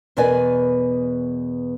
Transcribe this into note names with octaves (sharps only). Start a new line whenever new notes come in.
E2 B2 A#4 B4 D5 G#5